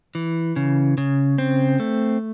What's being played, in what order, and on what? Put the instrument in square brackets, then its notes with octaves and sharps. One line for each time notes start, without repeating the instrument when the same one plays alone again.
[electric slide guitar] E3
C#3
C#3
C4
A3